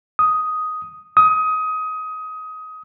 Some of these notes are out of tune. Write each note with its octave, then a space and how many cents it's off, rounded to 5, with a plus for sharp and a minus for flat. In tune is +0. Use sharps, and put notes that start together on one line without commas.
D#6 +5
D#6 +20